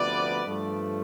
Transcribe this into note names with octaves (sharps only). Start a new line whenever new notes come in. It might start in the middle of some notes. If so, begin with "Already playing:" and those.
Already playing: D2 C3 F3 B3 B4 D5
G2 F3 A3